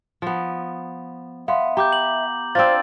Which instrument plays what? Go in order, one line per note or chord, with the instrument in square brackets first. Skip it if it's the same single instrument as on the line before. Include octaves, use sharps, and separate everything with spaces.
[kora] F3 B3
[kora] B3 [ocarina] E5 [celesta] F5 C6
[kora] G4 [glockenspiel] A#5 D6 G6
[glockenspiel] F#7
[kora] C4 D4 F4 [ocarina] C5 [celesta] F5 E6 [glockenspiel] A6